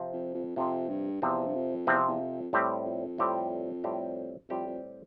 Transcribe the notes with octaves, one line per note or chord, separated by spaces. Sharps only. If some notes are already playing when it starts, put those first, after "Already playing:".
Already playing: C3 F3 C4
F2
F2
F2 C3 F3 C4
G2
E2 C3 F3 C4
G2
F2
E2 C3 F3 C4
E2
F2
A2 G3 C4 G4
F2
A2 G3 C4 G4
A2 G3 C4 G4
F2 A2 G3 C4 G4
F2